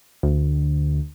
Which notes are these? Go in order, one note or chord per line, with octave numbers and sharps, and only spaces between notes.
D2